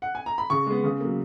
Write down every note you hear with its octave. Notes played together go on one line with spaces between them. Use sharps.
F#5
G#5
A#5
B5
C#3 C#6
G#3 B3
C#3
F#3 A#3